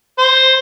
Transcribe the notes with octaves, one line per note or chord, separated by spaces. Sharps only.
C5